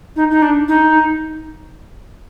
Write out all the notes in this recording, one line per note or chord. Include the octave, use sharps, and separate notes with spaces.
D#4
D#4
D4
D#4